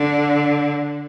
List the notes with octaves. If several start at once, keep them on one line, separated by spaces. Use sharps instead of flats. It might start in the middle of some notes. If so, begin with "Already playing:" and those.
Already playing: D3